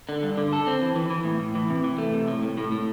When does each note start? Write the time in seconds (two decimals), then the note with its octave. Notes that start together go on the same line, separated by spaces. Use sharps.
0.09 D3
0.23 G2
0.38 D3
0.53 A4
0.67 C4
0.82 E3
0.96 E3
1.10 E3
1.25 A2
1.39 A2
1.55 E3
1.70 C3
1.84 E3
1.98 A3
2.14 C3
2.28 A2
2.43 A2
2.58 A2
2.72 A2